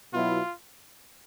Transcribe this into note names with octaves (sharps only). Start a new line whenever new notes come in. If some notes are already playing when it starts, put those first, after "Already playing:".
B2 F#3 B3 E4 F4